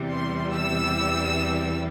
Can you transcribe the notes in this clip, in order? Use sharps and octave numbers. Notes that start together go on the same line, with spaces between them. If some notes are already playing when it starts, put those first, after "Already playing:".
Already playing: E2 C3 E3 G3
C6
E6